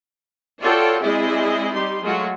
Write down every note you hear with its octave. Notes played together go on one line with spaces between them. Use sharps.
F4 F#4 A4 C#5 D5 G5
G#3 C4 E4 G#4 D5 D#5
G3 D#4 G4 C6
F#3 G#3 A3 F4 F#4 C#5